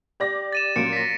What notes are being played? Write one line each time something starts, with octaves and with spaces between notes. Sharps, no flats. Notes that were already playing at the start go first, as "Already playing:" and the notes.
G4 D5 A#6
A6 D#7 E7
A#2 F#3 C#4 C#7 D7
A#6 B6